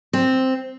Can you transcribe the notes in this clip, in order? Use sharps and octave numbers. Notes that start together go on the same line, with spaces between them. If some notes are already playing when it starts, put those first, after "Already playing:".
C4